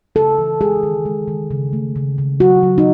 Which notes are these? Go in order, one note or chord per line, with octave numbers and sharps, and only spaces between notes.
C#3 A4
E3
G#3 G#4
D#3
G#3
D#3
C#3
A3
C#3
C#3
F#3 F#4
F#3
D#4